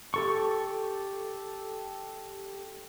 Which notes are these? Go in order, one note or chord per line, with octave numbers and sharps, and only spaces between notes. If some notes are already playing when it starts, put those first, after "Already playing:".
G4 A4 C#6